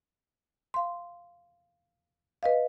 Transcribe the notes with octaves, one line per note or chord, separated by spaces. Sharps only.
F5 C6
B4 D#5 F5